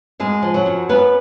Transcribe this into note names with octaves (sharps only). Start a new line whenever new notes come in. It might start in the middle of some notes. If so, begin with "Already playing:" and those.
F#2 G#3 G#4
F3
F#3 F#4
F#2
F#2 B3 B4